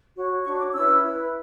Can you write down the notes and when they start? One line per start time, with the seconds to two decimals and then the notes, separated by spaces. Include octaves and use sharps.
0.15 F#4 C#5
0.43 D4 F#4 C#5 C#6
0.58 D6
0.73 C#4 E4 B4 E6
1.02 E4 B4